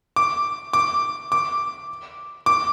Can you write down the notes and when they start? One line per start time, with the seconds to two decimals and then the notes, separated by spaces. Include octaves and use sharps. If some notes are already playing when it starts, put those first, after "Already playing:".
0.16 D6
0.73 D6
1.32 D6
2.46 D6